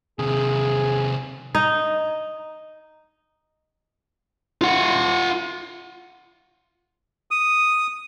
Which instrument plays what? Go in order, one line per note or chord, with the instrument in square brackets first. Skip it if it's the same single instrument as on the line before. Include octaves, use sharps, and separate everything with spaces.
[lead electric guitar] C3 D#3 [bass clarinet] G#4
[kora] D#4
[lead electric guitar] F4 F#5
[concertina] D#6